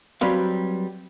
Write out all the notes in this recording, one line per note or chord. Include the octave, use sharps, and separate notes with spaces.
F#3 G3 C4 B4 F5